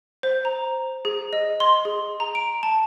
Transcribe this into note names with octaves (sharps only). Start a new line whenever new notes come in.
C5
A#5
G#4
D#5
C6
G#4
A#5
D7
A5